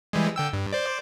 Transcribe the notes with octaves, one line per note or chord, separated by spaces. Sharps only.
E3 G3 G#3
D3 G5 E6
G2
C5 D5